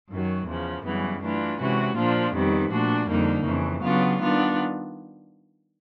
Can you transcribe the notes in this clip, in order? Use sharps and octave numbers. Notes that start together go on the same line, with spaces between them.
F#2 D#3 F#3
E2 C#3 F3
F#2 C#3 E3 G3 B3
E3 A3 D4 F4
C3 E3 G#3 C#4 F#4
A#2 F3 A#3 D4 F4
F2 C3 D#3 G3 B3
A#2 F3 A3 D4 F#4
F2 D3 G3 A#3 D#4
F2 C#3 E3
C#3 F#3 B3 D4 F4
D#3 G3 B3 D4 F4